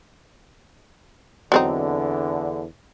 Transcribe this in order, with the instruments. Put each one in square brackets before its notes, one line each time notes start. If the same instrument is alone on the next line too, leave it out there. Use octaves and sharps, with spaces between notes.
[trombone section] E2 D3 [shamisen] F#3 C4 D#4